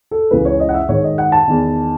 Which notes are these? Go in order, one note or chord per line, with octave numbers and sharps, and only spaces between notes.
A4
C#2 C#3 E3 B4
C#5
D#5
F#5
E5
G#2 D#3 C#5
D#5
F#5
A5
E2 D#3